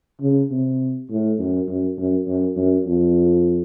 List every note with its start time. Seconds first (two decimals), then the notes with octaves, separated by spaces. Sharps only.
0.21 C#3
0.51 C3
1.10 A2
1.39 F#2
1.68 F#2
1.98 F#2
2.27 F#2
2.57 F#2
2.86 F2